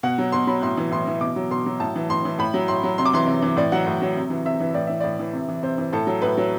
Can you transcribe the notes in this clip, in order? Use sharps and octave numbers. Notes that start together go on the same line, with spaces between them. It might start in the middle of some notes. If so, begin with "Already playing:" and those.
B2 F#5
F#3
B2 C6
F#3 B5
A2 C6
E3
A2 C6
E3
B2 D6
F#3
B2 C6
F#3
A2 A5
E3
A2 C6
E3
A2 B5
F#3
A2 C6
F#3
C3 C6
D6
E3 C6
C3
E3
A2 D5
F#3 F#5
A2
F#3
C3
E3
C3 E5
E3
A2 D5
E3 E5
A2 D5
E3
C3
E3
C3 C5
E3
A2 A4
F#3
A2 B4
F#3